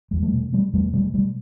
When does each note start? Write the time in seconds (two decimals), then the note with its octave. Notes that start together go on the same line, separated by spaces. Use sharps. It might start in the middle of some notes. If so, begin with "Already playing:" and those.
0.11 E2 G#3
0.23 G3 A3
0.33 B2
0.53 B2 G3 A3
0.73 E2 G3 A3
0.93 B2 G3 A3
1.14 B2 G3 A3